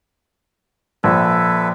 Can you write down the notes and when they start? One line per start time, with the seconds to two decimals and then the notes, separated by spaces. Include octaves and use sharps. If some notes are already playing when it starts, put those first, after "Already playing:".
1.04 A#1 A4 B4 E5